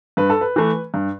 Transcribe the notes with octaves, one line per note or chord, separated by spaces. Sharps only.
G2 B4
A4
B4
E3 A3
G2